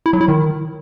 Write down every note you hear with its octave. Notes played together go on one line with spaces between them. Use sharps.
E4
F#3
E4
D#3